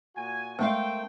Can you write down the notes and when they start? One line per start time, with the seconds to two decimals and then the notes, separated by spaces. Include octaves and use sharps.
0.16 A#2 F#4 G#5
0.59 G#3 A3 C4 A#4 F5 G5